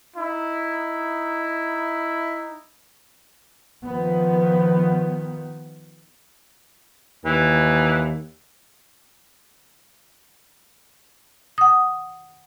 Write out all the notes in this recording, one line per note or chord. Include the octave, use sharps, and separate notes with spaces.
D#4 E4
D#3 F3 B3
D#2 E3
F#5 D#6